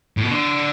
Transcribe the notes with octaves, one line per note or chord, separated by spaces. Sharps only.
A2
B2
D3